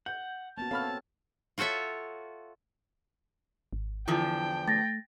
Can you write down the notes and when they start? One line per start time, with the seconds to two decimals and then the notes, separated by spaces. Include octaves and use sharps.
0.06 F#5 G6
0.58 A#3 B3 C#4 F#4 A5
0.71 C4 A4 C#5 F5 B5 F6
1.58 F4 F#4 A4 C#5 E5
3.73 G#1
4.08 E2 D3 F3 E4 G5
4.68 A3 A6 A#6